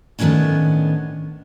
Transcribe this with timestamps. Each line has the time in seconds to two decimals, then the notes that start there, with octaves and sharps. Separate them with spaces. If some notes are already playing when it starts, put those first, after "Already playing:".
0.19 A2 D#3 F3 B3 C#4 D4